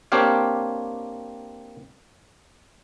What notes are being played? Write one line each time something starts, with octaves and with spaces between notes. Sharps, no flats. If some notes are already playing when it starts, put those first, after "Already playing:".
A#3 C4 D4 G4 C#5 F5